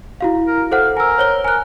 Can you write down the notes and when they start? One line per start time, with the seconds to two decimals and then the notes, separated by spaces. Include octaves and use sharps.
0.21 E4 F#4 F5
0.47 A#4
0.71 A4 C5 F5 F#5
0.97 A#4 G#5 E6
1.18 C5 C#5 G7
1.45 A#4 G#5 F#6